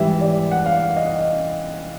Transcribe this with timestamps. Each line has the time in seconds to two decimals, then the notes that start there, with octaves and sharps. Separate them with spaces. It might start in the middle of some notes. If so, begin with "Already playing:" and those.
Already playing: G#2 E3 G3 E5
0.21 D5
0.51 F#5
0.66 F5
0.96 D#5